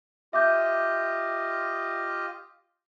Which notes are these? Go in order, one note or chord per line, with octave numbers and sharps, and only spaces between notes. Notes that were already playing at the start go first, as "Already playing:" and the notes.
F4 G4 D#5 E5 D6 G6